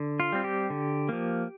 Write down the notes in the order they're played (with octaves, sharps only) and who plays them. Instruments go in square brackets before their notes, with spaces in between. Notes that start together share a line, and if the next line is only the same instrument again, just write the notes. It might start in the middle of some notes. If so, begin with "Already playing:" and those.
Already playing: [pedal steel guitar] D3
F4
G3 C4
G4
D3
F3 A#3